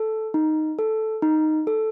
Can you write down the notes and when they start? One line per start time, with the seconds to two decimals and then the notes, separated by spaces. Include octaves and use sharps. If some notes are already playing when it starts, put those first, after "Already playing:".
Already playing: A4
0.34 D#4
0.79 A4
1.22 D#4
1.67 A4